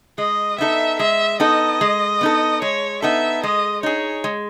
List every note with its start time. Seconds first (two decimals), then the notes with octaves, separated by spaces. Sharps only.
0.18 G#3 D#5
0.58 B3 D#4 A4 E5
0.99 G#3 E5
1.40 B3 D#4 A4 D#5
1.81 G#3
2.21 B3 D#4 A4
2.62 G#3 C#5
3.02 B3 D#4 A4 E5
3.43 G#3 D#5
3.83 D#4 G#4 C#5
4.24 G#3